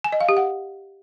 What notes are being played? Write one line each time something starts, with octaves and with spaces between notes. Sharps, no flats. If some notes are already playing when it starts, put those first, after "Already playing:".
G#5
D#5
F5
G4
F#5